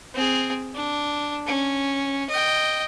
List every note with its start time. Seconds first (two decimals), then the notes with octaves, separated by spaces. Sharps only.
0.14 C4 G#4
0.74 D4
1.46 C#4
2.29 D#5 G5